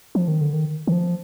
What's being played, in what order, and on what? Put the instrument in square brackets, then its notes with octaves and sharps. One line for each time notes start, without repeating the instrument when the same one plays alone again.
[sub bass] F3
D#3
D3
D#3
D#3
F3